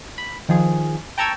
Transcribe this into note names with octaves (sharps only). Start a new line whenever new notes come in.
B5
D#3 F3 G#4
G5 A5 A#5 C#6 E6 G#6